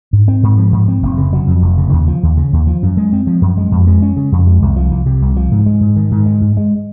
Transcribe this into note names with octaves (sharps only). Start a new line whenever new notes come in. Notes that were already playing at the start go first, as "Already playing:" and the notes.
G#2
C4
G#2
F3
G#2
C4
F1
C#3
F#3
F2
F1
C#3
D#2
F3
D#2
C#3
D#2
F3
F#2
G#3
C4
F3
F#2
G#3
F2
G#3
C#4
C#3
F2
G#3
C2
F3
C2
C3
C2
F3
G#2
G#3
G#2
D#3
G#2
G#3
G#2
G#3